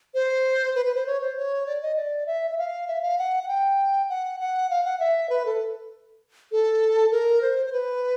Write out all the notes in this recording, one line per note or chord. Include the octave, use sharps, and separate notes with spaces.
C5
B4
B4
C5
C#5
C5
C#5
D5
D#5
D5
E5
E5
F5
E5
F5
F#5
F#5
G5
F#5
F#5
F5
F#5
E5
B4
A4
A4
A#4
C5
C5
B4